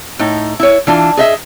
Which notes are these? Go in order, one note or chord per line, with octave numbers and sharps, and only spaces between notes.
A2 D#4
E4 C#5
E3 D4 F4
G#4 D#5 E5